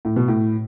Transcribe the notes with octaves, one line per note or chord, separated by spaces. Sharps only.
A2
B2
A2